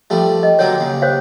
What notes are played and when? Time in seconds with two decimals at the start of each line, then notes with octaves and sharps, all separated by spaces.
0.10 F3 G3 A3 G4
0.43 D#5
0.59 D3 F#3 A#3 C#5
0.78 D#2 C#3
1.02 C5 C#5 F5